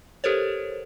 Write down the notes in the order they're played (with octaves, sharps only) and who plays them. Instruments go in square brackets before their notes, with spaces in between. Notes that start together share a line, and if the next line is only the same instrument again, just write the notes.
[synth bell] G4 A4 A#4 C5 C#5